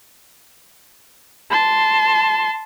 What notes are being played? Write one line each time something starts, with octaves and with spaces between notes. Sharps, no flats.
A5 C6